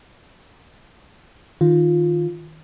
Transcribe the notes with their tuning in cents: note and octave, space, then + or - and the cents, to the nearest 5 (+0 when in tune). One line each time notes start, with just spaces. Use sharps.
D#3 +0 F4 +5